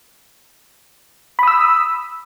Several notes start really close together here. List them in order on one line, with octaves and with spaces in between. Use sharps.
B5 D#6 E6